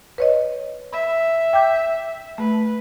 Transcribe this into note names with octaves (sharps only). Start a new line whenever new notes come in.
B4 C#5 D#5
E5 B5
G5 D6 G6
A3 B4